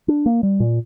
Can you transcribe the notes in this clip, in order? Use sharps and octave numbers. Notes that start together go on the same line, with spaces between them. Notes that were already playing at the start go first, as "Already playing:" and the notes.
D4
A#3
G3
A#2